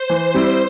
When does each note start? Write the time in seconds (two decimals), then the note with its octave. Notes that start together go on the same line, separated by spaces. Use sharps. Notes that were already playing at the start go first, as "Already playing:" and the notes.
Already playing: C5
0.10 E3
0.34 G3 C4 E4